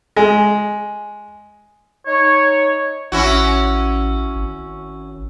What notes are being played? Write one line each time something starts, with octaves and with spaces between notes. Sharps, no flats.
G#3
D#4 C#5
A1 C#4 E4 F#4
G#1